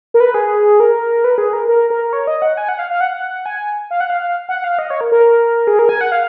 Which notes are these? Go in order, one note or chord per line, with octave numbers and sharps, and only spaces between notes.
A#4
B4
G#4
A#4
B4
G#4
A#4
A#4
A#4
C#5
D#5
F#5
G#5
F#5
F5
F5
F#5
G#5
F5
F#5
F5
F#5
F5
D#5
C#5
A#4
A#4
G#4
A#4
G#5
F#5
F5